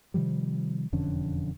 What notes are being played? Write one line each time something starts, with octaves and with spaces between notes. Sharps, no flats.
C3 D#3 F3 G3
E1 F2 D3 C#4